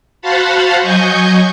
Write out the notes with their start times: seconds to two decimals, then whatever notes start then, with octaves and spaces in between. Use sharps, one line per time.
0.22 F#4 C5 F5 F#5 A5 B5
0.82 F#3 D#5 G#5 C#6 G6